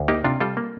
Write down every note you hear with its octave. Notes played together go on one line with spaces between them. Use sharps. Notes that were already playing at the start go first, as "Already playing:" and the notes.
Already playing: D2
A#3 D#4 G4
C3 D4 F4
G3 F4 A4
A#3